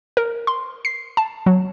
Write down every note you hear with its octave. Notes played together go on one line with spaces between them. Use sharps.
A#4
C6
C7
A5
F#3